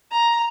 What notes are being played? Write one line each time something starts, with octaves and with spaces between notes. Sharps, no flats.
A#5